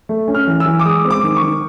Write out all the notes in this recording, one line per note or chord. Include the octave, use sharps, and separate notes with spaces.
A3
C#4
F6
E3
E6
E3
D6
G#3 D#6
C4
D6
D#3
C#6
D#3